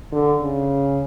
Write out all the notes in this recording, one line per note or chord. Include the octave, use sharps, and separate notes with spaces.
D3
C#3